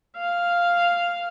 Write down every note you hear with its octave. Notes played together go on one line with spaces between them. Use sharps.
F5